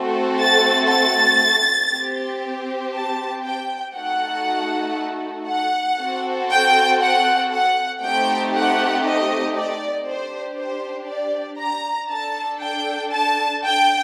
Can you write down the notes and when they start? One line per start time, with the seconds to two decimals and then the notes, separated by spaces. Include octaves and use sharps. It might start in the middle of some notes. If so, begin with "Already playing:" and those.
Already playing: A3 C4 F#4 A4
0.39 A6
0.90 A6
1.91 C4 G4
2.94 A5
3.44 G5
3.95 A3 D#4 F#4 A4 F#5
5.48 F#5
5.99 C4 F#4 A4
6.50 G5
7.01 F#5
7.51 F#5
8.02 A3 C4 D#4 G4 G5
8.54 F#5
9.05 D#5
9.56 D5
10.06 D4 G4 C5
10.58 C5
11.08 D5
11.60 A#5
12.10 D4 A4 A5
12.62 G5
13.12 A5
13.63 G5